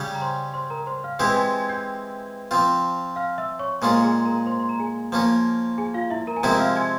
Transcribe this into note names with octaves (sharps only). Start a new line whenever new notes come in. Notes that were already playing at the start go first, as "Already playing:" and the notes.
Already playing: C#3 G3 C#4 G4
A#5
C5 C6
C5 C6
A#4 A#5
C5 C6
F5 F6
E3 G#3 C4 E4 G4 G5 G6
G#5 G#6
G#5 G#6
G5 G6
F3 C4 F4
F5 F6
E5 E6
C#5 C#6
A#2 G#3 C#4 F4 C5 C6
G#4 G#5
A#4 A#5
C5 C6
C6
A#5
G#4 G#5
F3 A#3 C#4
G#4 G#5
F4 F5
E4 E5
A#4 A#5
G#5
C3 F3 G#3 C4 E4 A#4 A#5
F5 F6
G#5 G#6